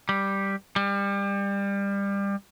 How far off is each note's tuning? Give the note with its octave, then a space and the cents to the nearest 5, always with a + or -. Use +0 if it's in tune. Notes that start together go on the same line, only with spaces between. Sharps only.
G3 +0
G3 +25